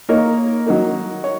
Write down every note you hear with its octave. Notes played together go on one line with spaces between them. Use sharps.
A#3 D#4 A#4 C#5
F#3 D#4 A#4
C#5